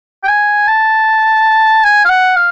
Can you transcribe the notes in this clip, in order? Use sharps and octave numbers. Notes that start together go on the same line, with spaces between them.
G5
G#5
A5
G#5
F5
F#5
F5